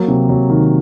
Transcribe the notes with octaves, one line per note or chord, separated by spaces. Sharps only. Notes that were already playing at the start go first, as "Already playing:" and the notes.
Already playing: F#3 A#3
C3
F#3
D#3